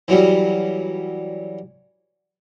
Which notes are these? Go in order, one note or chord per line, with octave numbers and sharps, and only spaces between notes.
E3 F#3 G3